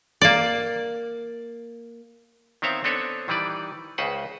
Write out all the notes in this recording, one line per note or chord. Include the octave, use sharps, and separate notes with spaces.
A#3 D5
D#3 B3 C4 C#5 E5 F5
B3 C4 D4 A4 B4 C#5
D#3 E3 G3 B4 D5
C#2 C#3 B4 C5 F#5